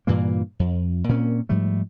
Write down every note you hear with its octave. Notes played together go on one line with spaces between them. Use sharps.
G2 A#2 E3 A#3
F2
A#2 A#3 C4 C#4
G#2 F3 G3 A3